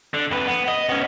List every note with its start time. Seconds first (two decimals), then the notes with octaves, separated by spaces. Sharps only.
0.14 D3
0.31 F2 B4
0.47 B3
0.68 D#5
0.89 B3 C#4